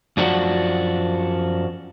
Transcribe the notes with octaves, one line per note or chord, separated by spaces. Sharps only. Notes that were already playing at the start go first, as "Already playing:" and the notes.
F#2 F3 D4 F#4